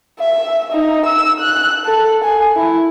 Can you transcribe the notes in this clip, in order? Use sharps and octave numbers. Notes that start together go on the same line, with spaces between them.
E5
D#4
E6
F#6
A4
G#5
E4